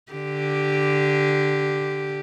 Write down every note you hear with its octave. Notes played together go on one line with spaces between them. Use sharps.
D3 G4